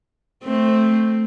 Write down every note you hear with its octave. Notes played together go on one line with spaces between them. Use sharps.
A3 C4